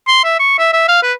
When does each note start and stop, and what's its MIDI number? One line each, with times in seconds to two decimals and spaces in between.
0.07 0.21 84
0.24 0.38 76
0.40 0.56 85
0.59 0.72 76
0.73 0.86 76
0.88 1.03 77
1.03 1.13 71